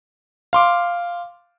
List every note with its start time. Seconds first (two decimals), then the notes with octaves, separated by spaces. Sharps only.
0.53 F5 C6 D6